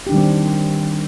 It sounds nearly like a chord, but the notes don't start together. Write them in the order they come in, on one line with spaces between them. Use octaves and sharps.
G4 D4 D#3 G3 C4